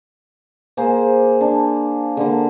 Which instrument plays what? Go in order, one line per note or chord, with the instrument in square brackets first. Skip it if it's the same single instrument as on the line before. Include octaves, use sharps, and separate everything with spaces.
[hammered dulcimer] A#3 G#4 C5
D4
D3 A#3